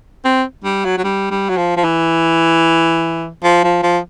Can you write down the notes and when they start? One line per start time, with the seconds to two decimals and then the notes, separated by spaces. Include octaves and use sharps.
0.25 C4
0.64 G3
0.85 F#3
0.98 F#3
1.04 G3
1.31 G3
1.49 F#3
1.57 F3
1.77 F3
1.84 E3
3.43 F3
3.64 F3
3.83 F3